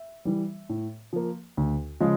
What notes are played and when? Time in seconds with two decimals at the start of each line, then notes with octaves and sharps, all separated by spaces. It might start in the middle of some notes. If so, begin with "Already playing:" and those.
Already playing: E5
0.25 E3 G3
0.69 A2
1.13 F3 A#3
1.57 D2
2.00 C#3 F3 G#3